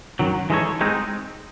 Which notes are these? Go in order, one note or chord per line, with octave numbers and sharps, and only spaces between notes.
F#2 D#3 F#3
E3 G#3 D#4 A4 C#5
G#3 C4 D#4